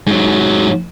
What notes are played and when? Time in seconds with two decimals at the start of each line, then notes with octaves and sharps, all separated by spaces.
0.07 G#2 F#3